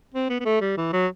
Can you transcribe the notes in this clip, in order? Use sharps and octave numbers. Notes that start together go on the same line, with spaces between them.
C4
B3
B3
A3
G3
E3
F#3